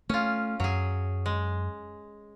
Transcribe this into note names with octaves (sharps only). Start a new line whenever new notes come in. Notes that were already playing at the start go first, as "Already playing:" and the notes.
A3 C#4 F4
F#2 F#3 G#4
G#3